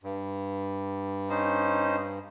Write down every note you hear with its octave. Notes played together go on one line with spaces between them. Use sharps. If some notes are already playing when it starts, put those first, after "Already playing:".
G2
C#4 D#4 C5